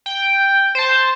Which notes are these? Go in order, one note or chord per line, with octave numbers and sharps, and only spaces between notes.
G5
C5 A5